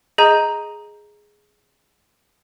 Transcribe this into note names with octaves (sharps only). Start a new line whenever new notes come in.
G#4 D#5 A#5 G6 D#7